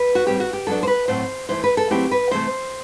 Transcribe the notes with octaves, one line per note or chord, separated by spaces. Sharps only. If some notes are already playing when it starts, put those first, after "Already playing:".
Already playing: B4
F#4
A2 G3 C4 G4
F#4
G4
F#3 B3 D4 A4
C5
B4
A2 F#3 A3 C4 C5
E3 A3 E4 C5
B4
A4
F#3 A3 C4 E4 G4
B4
C3 E3 A3 C5